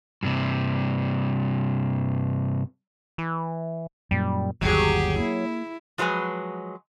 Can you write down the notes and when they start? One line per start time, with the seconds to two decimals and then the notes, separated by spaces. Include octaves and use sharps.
0.23 G2 C3
3.18 E3
4.11 F#2 A#2 G3
4.61 G1 D#2 F#3 G4 G#4
5.20 A#3 E4
5.98 F3 F#3 G#3 B4 G#5